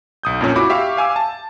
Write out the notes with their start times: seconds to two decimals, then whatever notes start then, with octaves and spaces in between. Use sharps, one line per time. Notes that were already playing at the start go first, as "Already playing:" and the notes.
0.23 B1 D#6 G6
0.41 F2 A#2 C#4
0.55 E4 F#4 B5 D6
0.69 G4 E5 F5 C#6
0.97 F5 G#5 D6 E6
1.16 A5